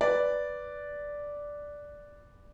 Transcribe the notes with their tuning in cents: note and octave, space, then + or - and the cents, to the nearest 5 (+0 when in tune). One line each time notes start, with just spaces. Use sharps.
B4 +0 D5 -5